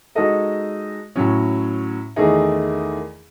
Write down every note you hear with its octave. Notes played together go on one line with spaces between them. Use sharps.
G#3 D#4 F#4 A4 D#5
A2 F#3 C#4
E2 D#3 A3 D#4 G#4